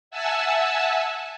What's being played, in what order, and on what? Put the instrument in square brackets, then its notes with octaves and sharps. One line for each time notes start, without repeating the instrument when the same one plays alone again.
[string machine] E5 F#5 G#5 A5 E6